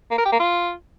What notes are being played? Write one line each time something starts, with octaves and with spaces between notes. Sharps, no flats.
A#3
A#4
G4
A#3
F4